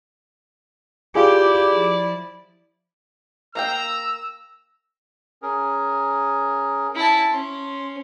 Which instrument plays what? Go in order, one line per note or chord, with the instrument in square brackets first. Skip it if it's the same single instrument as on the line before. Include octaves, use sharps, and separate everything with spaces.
[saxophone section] E4 D5 [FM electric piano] F4 G#4 [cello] G4
[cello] F3
[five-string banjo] A#3 F5 G5 [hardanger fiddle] A#5 [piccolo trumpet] E6
[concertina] C#4 G#4 A#4
[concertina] C#4 [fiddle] E4 A5
[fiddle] C#4 [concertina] C6